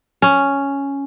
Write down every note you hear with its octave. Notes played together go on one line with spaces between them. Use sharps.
C#4